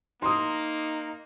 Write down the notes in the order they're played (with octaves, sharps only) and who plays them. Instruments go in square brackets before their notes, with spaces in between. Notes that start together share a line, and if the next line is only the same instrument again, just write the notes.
[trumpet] A#3 [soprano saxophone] D#4 [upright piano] C6 D#6